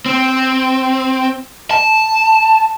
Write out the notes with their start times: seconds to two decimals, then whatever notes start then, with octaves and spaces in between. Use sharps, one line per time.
0.06 C4
1.71 A5